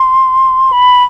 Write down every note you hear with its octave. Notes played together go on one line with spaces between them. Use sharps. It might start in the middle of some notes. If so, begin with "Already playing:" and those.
Already playing: C6
B5